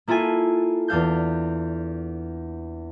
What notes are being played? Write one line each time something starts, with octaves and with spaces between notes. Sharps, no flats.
A#3 E4 F4 A4 G#5
E2 D4 F5 G6